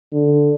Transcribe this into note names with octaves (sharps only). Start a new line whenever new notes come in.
D3